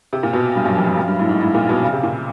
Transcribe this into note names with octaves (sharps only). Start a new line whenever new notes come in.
C3
A#2
B2
G2
F#2
F2
F#2
F#2
G2
A2
G#2
A2
A#2
B2
C#3
C3
A#2